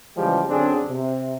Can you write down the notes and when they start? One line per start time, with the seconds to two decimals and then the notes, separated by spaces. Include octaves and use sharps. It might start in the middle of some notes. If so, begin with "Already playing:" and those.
0.16 C#3 E3 F3 G3 G#3 G4
0.49 F#2 D3 C4 D4 G#4
0.88 C3